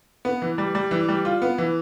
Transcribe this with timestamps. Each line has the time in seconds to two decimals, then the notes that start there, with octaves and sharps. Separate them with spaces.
0.25 B3
0.42 E3
0.58 G3
0.75 G3
0.91 E3
1.08 G3
1.25 F4
1.42 B3
1.58 E3